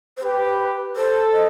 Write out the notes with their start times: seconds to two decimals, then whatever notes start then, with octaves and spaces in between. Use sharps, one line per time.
0.17 C5
0.23 G4 B4
0.96 A4 C5
1.33 D#5